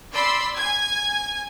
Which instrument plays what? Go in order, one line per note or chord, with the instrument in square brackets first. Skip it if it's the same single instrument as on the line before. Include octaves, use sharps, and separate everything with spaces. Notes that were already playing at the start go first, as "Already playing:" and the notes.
[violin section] D5 B5 C6 E6
G#5 G#6